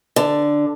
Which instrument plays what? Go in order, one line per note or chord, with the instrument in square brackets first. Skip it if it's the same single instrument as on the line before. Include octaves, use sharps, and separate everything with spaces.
[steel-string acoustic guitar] D3